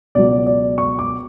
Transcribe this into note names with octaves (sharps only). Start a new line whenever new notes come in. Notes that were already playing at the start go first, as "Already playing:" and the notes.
C#2 B2 F#3 D5
D5
C#6
D6